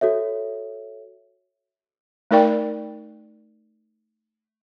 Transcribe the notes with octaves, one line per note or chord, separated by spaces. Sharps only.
F#4 A4 C#5 E5
A3 D#4 A#4 D5 G5